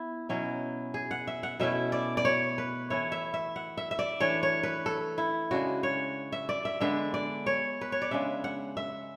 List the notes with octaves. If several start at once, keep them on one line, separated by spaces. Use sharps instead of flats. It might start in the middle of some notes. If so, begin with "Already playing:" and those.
Already playing: B3 E4
B2 F#3 C#4 E4
G#4
F#5
E5
F#5
B2 A3 C#4 E4 E5
D5
D5
C#5
B4
E3 A3 E4 C#5
E5
E5
F#5
E5
E5
D5
E3 A3 D4 C#5
C#5
B4
A4
E4
C#3 G#3 D4 F#4
C#5
E5
D5
E5
D3 G#3 B3 D4 E5
D5
C#5
B4
C#5
D5
C#3 G#3 D4 E5
F#5
E5